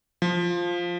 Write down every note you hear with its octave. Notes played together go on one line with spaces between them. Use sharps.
F3